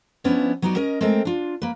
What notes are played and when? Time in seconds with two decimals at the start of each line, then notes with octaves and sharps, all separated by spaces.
0.24 F3 B3 C#4 D4 E4 C#5
0.62 F#3 B3 D#4 F#4 D5
0.76 C#4 A#4 D#5
1.01 G#3 A3 C4 A4 A#4
1.25 D4 F4
1.62 A#3 B4